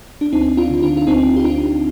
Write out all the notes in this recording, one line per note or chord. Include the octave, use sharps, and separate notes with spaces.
D4
D2 C4 D#4
D4 F4
D3
D4 F4
F4
D2 C4 D#4
G4
D2 D4 F4